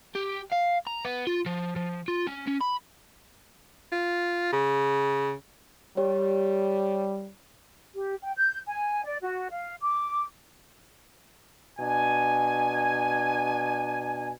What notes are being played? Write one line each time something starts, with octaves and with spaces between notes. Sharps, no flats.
G4
F5
A#5
B3
F4
F3
F3
F4
C#4
C#4
B5
F4
C#3
G3 G4 C#5
G4
G5
G6
G#5
D5
F#4
F5
D6
B2 D4 G#5